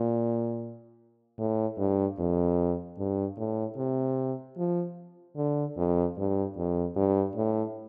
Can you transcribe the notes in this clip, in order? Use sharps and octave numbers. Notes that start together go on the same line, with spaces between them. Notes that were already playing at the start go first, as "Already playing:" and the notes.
Already playing: A#2
A2
G2
F2
G2
A2
C3
F3
D3
F2
G2
F2
G2
A2